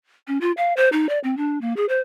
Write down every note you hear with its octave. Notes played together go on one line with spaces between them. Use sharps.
C#4
F4
F5
C5
D#4
D5
C4
D4
A#3
G#4
C5